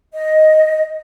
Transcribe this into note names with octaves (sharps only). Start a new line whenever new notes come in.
D#5